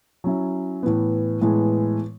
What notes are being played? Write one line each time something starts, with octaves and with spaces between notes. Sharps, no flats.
F#3 C#4 E4
A2 E3 B3
A2 E3 G#3 B3